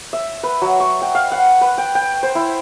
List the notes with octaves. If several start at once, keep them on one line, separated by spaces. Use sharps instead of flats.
E5
B4
F#3
C#6
G5
F5
F#5
B4
G5
G5
C5
E4